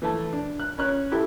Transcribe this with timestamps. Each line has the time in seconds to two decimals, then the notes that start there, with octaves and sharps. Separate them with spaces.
0.02 E3 A3 A5
0.33 D4
0.60 F#6
0.78 C#4 C#5 F#6
1.11 E4 G4 A4